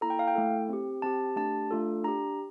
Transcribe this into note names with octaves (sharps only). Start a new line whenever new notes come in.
A#3 E4 A4 A#5
G5
F5
G5
A3 E4 A4
C4 G4
C4 G4 A5
A3 D4 G4 A5
A3 D4 F4 A4
D4 G4 A#5